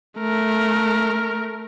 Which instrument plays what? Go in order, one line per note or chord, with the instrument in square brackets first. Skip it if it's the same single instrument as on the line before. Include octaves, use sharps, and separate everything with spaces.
[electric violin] A3 A#4